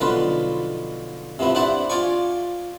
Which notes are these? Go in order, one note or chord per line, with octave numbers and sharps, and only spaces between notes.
B1 D3 F3 F4 B4
C3 F3 B3 E4
D4 E4 C5 E5 F#5 A5
F4 D5 G#5 C#6